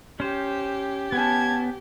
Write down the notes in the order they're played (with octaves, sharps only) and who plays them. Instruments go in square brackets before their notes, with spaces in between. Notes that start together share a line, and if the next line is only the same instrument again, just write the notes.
[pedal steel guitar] C#4 C5 [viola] G4
[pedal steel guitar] B3 [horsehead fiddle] C#4 A5 [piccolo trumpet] G#6